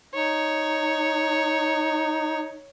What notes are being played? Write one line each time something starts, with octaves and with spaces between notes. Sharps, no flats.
D#4 C#5